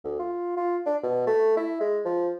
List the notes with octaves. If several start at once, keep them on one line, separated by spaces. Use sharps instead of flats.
D2
F4
F4
D4
B2
A3
E4
G#3
F3